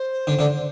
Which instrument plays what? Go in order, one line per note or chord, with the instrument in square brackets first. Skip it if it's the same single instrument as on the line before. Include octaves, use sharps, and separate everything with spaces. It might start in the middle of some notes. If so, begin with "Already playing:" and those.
Already playing: [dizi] C5
[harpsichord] D3
D3